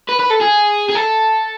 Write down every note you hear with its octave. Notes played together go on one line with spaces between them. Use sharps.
B4
B4
A4
G#4
G#4
A4